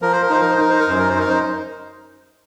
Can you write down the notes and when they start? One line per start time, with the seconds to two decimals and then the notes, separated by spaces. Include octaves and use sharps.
0.02 F3 A#4
0.12 C5
0.22 A#4
0.30 D#4 C5
0.41 A#4
0.51 C5
0.58 D#4 A#4
0.70 C5
0.80 A#4
0.88 F#2 C5
0.99 A#4
1.09 C5
1.16 D#4 A#4
1.29 C5